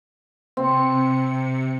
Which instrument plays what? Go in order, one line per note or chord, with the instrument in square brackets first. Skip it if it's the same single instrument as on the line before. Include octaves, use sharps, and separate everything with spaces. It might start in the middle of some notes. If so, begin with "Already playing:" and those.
[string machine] C3 C#7 [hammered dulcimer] C4